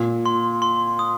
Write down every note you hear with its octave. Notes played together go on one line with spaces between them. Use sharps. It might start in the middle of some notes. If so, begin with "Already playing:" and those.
Already playing: A#2
C6
C6
D#6